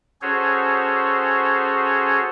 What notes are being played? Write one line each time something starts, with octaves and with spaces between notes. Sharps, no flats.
C#4 F#4 G#4 A4 C5 C#5